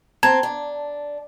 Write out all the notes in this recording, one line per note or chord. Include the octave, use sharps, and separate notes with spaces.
C4 A5 A#5 G#6
D4